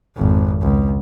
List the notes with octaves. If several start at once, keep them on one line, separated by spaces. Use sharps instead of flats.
G#1 F2
C#2